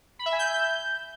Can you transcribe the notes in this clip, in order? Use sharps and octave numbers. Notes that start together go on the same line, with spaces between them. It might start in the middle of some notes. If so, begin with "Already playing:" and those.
B5
E5
G#5
G6